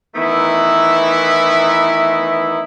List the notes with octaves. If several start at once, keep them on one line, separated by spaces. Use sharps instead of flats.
D#3 E3 A3 B3 D#4 E4